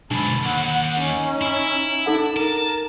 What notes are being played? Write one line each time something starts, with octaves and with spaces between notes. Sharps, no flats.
B1 G#2 D4 A5 B5
D#2 F#5
C#4 D#4
E4
D4 D#4 A4 F#5
A#4 A5